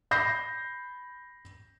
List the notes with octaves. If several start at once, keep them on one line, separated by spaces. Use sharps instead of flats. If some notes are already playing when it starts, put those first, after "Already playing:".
B5 G6 A#6 C7